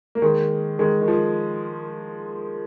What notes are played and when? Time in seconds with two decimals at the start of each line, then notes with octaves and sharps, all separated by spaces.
0.15 A#3
0.22 D#3 G#3
0.79 D#3 G#3
1.01 D#3
1.08 F3